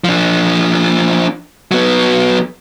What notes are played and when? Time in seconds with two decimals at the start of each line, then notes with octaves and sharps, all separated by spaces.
0.04 F3 D4
1.71 F#3 B3